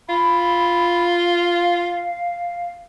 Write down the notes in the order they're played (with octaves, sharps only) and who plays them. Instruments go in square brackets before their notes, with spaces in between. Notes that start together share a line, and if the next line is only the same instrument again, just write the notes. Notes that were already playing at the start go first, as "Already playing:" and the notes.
[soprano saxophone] F4 [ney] B5
[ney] F5